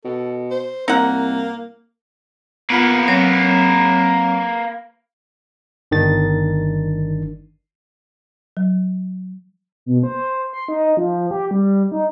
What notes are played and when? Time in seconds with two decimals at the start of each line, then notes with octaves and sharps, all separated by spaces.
0.05 B2 A4
0.51 C5
0.88 C2 A#3 D#4 F#5
2.70 A#3 B3 F4 B4 F#5
3.08 F#3 C4 C#5
5.91 G1 D#3 D4 A6
8.57 F#3
9.86 B2
10.03 C5
10.53 C6
10.68 D#4
10.97 F3
11.31 G4
11.51 G3
11.92 D#4